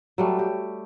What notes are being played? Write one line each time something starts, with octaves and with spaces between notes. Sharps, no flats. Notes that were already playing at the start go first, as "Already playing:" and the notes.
F#3 G3 A3
G4